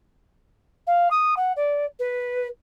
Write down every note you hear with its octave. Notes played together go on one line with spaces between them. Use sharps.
F5
D#6
F#5
D5
B4